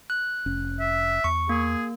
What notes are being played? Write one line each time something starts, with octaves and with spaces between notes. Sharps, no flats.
F#6
F1 C#4
E5
E2 C#6
A#3 G#4